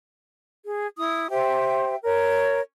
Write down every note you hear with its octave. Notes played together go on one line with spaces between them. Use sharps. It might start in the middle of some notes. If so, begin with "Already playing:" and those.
G#4
E4 D#6
G4 C5 E5 G5
A#4 C#5